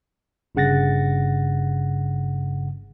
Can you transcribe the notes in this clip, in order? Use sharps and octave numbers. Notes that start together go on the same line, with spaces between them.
G1 G2 C#3 F#5 A6 A#6